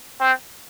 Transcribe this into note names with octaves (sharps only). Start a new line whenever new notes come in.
C4